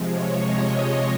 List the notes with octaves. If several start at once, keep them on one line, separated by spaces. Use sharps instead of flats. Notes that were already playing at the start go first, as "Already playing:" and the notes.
Already playing: C3 F3 G#3
C#5
D#5